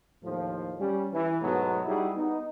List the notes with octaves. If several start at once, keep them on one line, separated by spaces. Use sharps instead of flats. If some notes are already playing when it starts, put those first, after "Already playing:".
D#2 A2 F3
G3 C#4
E3
G#2 B2 F#3 A3 B3
G3 D#4 E4 F#4 G#4
B3 D#4